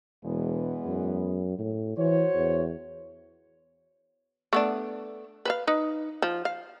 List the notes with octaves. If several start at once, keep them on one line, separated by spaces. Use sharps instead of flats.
E1 E2 G#3 B3
F#2
A2
E3 F#4 C5 C#5
E2
A3 B3 D4
B4 C5 F5
D#4 B4
F3
F5